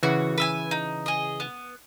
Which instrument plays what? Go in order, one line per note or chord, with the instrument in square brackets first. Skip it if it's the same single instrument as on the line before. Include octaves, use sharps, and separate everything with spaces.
[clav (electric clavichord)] C#3 E3 [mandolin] F#4
[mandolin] B4 E5 G#5
D#4
G#4 D#5
B3